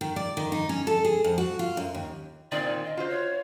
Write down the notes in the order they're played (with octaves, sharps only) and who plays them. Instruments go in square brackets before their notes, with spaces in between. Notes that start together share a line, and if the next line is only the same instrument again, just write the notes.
[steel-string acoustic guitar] D#3
D5
D#3
D#4
C#4
A4
G#4
F2
F#4
F4
F#2
D#2
[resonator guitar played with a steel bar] A#2 D#3 C4 [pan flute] D5
[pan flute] D#5
[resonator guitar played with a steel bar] F4 F#4 C5
[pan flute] C#5